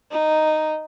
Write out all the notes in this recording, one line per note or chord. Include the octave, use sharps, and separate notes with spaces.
D#4